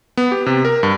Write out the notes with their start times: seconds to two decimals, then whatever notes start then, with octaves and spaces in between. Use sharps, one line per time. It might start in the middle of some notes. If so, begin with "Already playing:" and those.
0.17 B3
0.32 G4
0.46 C3
0.65 A#4
0.83 G2